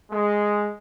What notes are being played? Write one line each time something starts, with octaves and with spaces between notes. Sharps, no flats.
G#3